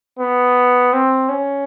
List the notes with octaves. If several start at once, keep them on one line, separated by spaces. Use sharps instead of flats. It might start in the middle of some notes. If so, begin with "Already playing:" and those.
B3
C4
C#4